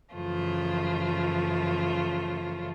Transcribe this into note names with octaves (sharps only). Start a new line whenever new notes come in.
F#2 C#3 E3 F3 A3 F4